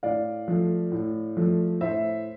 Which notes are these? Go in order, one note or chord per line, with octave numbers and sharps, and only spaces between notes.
A2 D5 F5
F3 A3
A2
F3 A3
A2 C5 E5